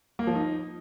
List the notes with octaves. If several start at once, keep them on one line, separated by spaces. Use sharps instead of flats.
A#3
F3
D#4